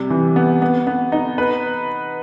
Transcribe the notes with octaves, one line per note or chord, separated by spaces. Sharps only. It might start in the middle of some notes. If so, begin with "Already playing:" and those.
Already playing: C3 G3
E3
B3
B3
B3
D#4
B4